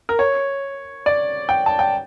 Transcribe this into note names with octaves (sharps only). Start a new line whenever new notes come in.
A#4
C#5
D5
G5
A5
G5